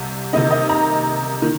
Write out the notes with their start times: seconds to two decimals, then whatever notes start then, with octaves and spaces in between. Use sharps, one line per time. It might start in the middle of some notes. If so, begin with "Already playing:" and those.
Already playing: C2 C3
0.33 C3 D#3 A#3 D#4 D#5
0.51 D#5
0.69 A#5
1.42 D#3